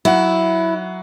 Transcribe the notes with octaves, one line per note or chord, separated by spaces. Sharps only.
F#3 E4 F#5